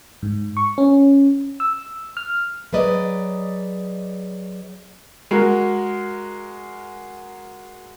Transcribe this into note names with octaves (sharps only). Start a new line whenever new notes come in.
G#2
C#6
C#4
E6
F6
F#3 G#4 B4 D5 D#5
G#3 F#4 A#4